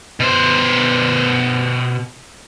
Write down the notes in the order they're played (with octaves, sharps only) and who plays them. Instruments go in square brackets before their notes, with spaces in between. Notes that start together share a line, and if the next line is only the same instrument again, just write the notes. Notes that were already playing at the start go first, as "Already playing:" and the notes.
[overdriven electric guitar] B2 C5